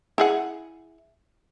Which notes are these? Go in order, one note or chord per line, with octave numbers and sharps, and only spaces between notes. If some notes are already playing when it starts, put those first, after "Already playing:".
E4 G#4 F#5